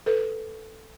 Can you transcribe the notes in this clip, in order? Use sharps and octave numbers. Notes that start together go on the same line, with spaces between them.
A4 B4